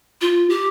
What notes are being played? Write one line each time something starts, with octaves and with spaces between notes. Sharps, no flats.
F4
G4